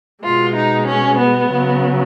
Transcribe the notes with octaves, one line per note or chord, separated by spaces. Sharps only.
B2 G#3 F4
D#4
C#4
B3
C#3 F#3